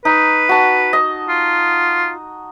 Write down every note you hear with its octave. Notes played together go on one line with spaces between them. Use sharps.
D#4 B4
F#4 A5
D#5
F4